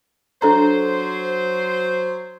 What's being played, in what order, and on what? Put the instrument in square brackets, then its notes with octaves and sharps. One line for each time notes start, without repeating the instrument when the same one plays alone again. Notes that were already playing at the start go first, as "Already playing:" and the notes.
[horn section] F#3 C5 [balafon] D4 A4 A#5